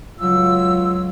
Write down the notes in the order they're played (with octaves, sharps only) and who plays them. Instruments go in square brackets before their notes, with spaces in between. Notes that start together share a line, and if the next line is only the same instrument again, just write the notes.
[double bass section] C#2 F#3 [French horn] F4 [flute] E6